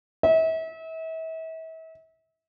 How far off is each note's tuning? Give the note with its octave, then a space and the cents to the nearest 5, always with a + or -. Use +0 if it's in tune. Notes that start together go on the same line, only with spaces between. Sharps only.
E5 -35